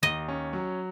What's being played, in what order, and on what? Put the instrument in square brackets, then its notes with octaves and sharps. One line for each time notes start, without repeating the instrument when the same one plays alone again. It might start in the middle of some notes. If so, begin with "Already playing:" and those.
[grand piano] D#2 [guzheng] D#5
[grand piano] C#4
F#3